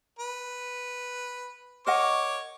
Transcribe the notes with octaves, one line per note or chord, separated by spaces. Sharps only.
B4
A#4 C#5 D#5 F#5 D6